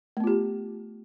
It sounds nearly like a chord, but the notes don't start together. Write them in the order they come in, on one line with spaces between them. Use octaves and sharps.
A3 B3 F4 G4